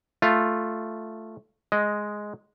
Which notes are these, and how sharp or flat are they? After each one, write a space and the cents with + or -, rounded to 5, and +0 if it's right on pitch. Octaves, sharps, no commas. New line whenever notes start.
A3 +0 F4 +0
G#3 +5 D#5 +0